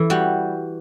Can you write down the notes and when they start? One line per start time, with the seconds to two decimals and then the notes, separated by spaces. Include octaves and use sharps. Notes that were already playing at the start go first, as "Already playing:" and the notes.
Already playing: E3 A4
0.10 G3 F#4